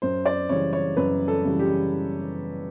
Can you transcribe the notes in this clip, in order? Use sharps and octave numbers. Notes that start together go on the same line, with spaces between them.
F#2 C5
D5
C#3 E3 G3 C#5
C#5
F#2 B4
A4
C#3 E3 G3
G4